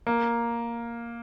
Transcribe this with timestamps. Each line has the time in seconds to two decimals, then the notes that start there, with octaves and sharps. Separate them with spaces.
0.07 A#3